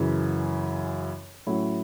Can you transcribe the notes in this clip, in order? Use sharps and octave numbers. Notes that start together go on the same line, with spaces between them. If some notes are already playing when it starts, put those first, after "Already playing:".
Already playing: F#2 C#3 E3
A2 F#3 C#4 E4